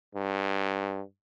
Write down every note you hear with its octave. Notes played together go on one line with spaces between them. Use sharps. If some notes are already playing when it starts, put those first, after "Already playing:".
G2